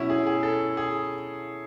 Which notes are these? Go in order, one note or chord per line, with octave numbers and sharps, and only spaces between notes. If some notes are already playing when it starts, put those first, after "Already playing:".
Already playing: B2 F#3 C#4 E4
G#4
G#4
A4
G#4